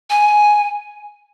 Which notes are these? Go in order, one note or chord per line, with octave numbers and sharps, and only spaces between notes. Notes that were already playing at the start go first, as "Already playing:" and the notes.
G#5